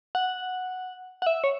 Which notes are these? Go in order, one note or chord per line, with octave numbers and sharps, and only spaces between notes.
F#5
F#5
E5
C#5